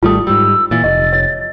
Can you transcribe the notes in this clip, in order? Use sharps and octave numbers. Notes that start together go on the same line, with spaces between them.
G#1 G3 A3 F4 D#6
G#2 G3 E6
A#2 E3 A6
F1 D#5
C#5